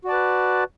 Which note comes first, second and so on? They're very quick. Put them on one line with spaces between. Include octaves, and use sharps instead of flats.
F#4 D5 A5 B4